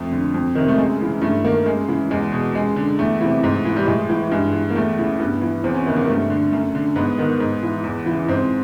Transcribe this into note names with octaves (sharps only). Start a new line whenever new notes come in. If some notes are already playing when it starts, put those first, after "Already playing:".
Already playing: F2 A3
D3
F2
C3 D#3
A3
F#2 G#3
C#3 E3
G2 A3
D#3 A#3
F#2 G#3
C#3 E3
E2 G#3
B2
F#2 G#3
D3
E2 A3
C3 E3
G#2
E3
G3
A2 G#3
E3
G2 G#3
E3
A#3
E2 A3
C#3 E3
G2 B3
E3
E2 C4
C#4
C3 D#3 B3
A#3
G2 A3
D3
F#2 A3
D3
G#2 B3
D#3 B3
G#2
E3
E2
E3
C#3
G#2 C4